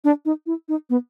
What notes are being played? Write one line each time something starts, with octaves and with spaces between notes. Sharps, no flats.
D4
D#4
E4
D#4
B3